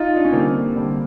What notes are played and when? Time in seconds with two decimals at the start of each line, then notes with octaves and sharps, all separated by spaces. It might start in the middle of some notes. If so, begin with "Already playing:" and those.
Already playing: D#4 F4
0.16 D4
0.25 C#4
0.32 D3 G3 A#3 C4
0.76 D3 G3